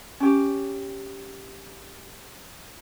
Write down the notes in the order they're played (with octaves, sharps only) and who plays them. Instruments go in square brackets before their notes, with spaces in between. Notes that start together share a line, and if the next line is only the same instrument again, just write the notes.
[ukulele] C#4 G4